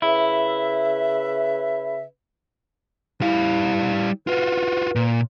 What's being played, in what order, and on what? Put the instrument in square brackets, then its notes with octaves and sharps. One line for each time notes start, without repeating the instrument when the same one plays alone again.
[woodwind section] C#3 B4 E5 [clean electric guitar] E4
[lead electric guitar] G3 F5 [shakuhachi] E4
[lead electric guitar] F4 F#4 [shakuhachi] B4
[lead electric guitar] A#2